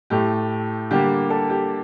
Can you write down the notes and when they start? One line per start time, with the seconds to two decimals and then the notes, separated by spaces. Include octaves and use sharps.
0.10 A2 A3 G4
0.91 D3 G3 A#3 G4
1.30 A4
1.50 G4